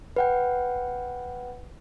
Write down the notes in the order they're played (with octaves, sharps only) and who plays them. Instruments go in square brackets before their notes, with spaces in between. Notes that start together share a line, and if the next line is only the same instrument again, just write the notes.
[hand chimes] B4 F#5 G5